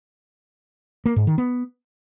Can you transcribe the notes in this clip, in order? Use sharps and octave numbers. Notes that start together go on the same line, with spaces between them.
A#3
G#2
D#3
B3